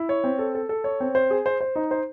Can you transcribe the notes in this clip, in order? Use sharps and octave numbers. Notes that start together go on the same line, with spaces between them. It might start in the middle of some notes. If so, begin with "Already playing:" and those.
Already playing: E4
C#5
C4
A4
A4
A4
C#5
C4
C5
G#4
C5
C5
D#4
C5